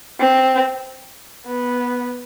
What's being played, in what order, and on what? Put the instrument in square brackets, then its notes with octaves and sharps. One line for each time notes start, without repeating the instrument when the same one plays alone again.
[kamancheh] C4
B3